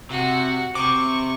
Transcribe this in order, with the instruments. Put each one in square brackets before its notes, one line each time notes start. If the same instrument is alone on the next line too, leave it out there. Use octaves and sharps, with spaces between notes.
[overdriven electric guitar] C3 [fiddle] F#4 F#5
[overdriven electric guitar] C3 [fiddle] C#6 [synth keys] D6